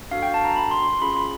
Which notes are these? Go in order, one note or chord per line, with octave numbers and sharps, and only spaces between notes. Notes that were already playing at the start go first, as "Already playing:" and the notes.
D4 F#4 A4 F5
G5
A5
A#5
B5
C6
C6
C#4 F4 G#4 B5
B5